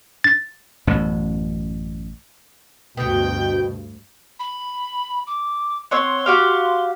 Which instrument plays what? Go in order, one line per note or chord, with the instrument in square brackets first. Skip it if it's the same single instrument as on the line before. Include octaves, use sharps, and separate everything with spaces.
[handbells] A6
[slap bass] A1 F#2 B2
[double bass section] D2 G2 [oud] B2 [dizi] G5
[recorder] B5
D6
[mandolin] C4 C#5 F#5 [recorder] C6
[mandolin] F#4 G4 F5